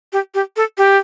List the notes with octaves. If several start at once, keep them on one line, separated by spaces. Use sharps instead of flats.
G4
G4
A4
G4